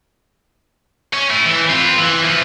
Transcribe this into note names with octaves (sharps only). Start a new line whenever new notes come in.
C#4
A3 E4
E3
C4 F4
E3
F3 B4